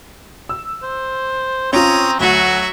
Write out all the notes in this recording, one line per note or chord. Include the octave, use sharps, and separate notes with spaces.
E6
C5
C4 C#4 F4 A#5 D#6
D2 F#3 F#4 E5